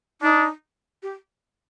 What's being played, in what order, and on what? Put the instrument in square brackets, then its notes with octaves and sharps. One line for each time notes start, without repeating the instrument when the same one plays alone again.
[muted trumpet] D4 [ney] D#4
[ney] G4